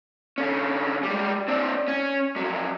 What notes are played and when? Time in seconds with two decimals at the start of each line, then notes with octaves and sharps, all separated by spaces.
0.38 D3 C#4
1.03 G3 G#3
1.48 C4 D4
1.88 C#4
2.36 F2 F#3